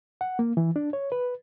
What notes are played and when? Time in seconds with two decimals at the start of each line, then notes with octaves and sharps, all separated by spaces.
0.21 F#5
0.39 A#3
0.57 E3
0.76 D4
0.93 C#5
1.12 B4